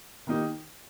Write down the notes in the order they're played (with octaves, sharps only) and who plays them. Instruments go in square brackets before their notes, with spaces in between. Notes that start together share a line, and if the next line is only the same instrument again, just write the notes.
[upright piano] D#3 A#3 D#4 G4